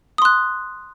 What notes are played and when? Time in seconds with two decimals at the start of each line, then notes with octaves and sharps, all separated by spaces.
0.18 D#6
0.22 C6
0.25 F#6